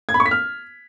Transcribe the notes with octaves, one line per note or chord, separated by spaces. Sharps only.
G#6
B5
C#6
B6
F6